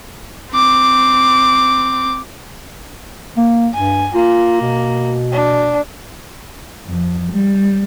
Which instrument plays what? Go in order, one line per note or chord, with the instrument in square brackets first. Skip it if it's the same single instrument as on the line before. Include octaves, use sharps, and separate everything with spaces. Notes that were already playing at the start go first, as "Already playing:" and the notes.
[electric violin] C4 D6
[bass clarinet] A#3
[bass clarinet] G2 [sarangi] G#5
[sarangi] A#3 [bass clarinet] F4
[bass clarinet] B2
[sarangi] D4
[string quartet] F2
G3